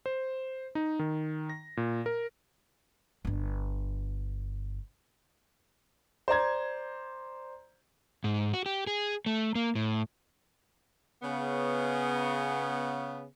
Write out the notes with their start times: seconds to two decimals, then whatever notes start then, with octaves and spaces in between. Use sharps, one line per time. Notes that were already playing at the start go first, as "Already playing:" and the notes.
0.06 C5
0.75 D#4
0.99 D#3
1.50 A#6
1.77 A#2
2.06 A#4
3.25 G1 D4
6.28 C5 D5 A#5 G#6
8.24 G#2
8.54 F#4
8.66 G4
8.87 G#4
9.26 A3
9.55 A#3
9.75 A2
11.22 C#3 B3